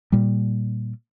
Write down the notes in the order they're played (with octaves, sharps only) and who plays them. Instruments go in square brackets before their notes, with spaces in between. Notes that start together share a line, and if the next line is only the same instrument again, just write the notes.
[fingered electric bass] A#2 G3